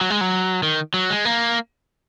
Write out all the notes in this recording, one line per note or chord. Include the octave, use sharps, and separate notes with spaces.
F#3
G#3
F#3
D#3
F#3
G#3
A#3